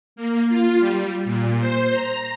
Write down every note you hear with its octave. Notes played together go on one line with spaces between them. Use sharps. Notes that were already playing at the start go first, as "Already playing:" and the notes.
A#3
F4
G3
A#2
C5
A#5